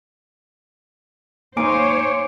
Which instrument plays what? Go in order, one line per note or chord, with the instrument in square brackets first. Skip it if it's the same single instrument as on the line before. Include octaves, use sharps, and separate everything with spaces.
[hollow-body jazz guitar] A#3 D#4 F5 [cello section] C5 C#5 [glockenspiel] G#5 D6 D7